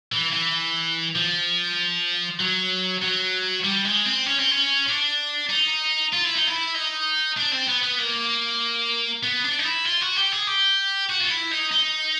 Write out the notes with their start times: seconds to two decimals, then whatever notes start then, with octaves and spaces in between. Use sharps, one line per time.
0.12 E3
0.32 E3
1.16 F3
2.40 F#3
3.02 F#3
3.64 G3
3.84 G#3
4.05 C4
4.26 C#4
4.39 C4
4.51 C#4
4.88 D4
5.50 D#4
6.13 F4
6.25 E4
6.35 D#4
6.48 E4
6.75 D#4
7.37 D4
7.52 C4
7.68 B3
7.83 B3
7.98 A#3
9.23 B3
9.44 D4
9.59 D#4
9.65 E4
9.85 F4
10.02 F#4
10.17 G4
10.32 G#4
10.47 G4
11.10 F#4
11.20 F4
11.30 E4
11.51 D#4
11.71 D#4